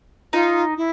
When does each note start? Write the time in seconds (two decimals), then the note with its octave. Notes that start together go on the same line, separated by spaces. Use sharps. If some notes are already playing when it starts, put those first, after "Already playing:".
0.33 D#4 F4
0.77 E4